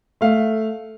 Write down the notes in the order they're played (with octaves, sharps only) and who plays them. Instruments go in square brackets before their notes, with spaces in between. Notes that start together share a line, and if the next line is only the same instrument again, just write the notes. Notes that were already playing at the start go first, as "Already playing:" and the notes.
[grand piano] A3 F5